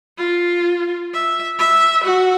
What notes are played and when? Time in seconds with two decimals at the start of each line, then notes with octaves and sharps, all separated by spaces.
0.18 F4
1.14 E5
1.59 E5
2.04 F#4